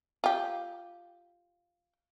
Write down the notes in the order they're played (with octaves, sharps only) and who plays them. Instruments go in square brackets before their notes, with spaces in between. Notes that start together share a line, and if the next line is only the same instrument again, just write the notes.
[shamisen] F4 G4